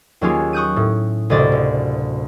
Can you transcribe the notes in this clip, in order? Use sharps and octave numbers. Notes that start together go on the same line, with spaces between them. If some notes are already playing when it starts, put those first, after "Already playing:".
D#2 F#3 A#3 C#4 F4 G#4
C#6 D#6 F#6 G6 D#7
A2
F#1 D2 C3 D#5 D6 A6
F#1